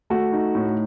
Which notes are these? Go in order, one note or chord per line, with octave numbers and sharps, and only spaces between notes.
A3 F#4
D#4
A2